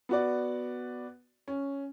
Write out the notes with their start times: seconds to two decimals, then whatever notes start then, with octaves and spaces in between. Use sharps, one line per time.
0.09 B3 F#4 D5
1.48 C#4